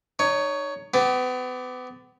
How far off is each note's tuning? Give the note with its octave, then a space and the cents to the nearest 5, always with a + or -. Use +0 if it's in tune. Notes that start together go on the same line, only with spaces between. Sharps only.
D#4 -25 C#5 +15
B3 +35 G4 +0